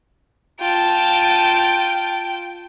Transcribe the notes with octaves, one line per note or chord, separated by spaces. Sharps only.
F4 G5 A5